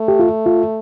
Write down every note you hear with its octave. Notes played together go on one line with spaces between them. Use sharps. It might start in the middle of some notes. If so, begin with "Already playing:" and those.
Already playing: A3
G4
F4
F4